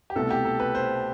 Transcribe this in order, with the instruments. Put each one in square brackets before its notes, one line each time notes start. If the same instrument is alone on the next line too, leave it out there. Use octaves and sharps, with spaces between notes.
[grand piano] G4
[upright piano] C2 B2 A3 [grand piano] A4
[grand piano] G4
A4
B4
C5